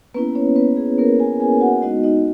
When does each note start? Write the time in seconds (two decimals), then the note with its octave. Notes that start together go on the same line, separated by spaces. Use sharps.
0.14 A#3 B3 C#4 E4 B4
0.35 C#4 C#5
0.56 B3 B4
0.77 G#4
0.98 A#3 A#4
1.19 G#4 G#5
1.40 G#4 G#5
1.61 F#4 F#5
1.82 G#3 B3 D#4 F#4 D#5
2.03 D#4 D#5